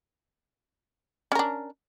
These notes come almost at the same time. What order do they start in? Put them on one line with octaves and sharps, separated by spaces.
C#4 A#4 D4